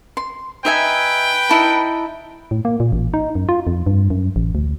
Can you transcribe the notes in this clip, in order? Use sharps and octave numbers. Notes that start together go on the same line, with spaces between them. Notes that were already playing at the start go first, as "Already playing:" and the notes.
C6
D#4 B4 E5 G5 G#5
D#4 E4 A5
A2
A#3
A#2
A1
D#4
F#2
F4
F2
G2
F#2
A1
D2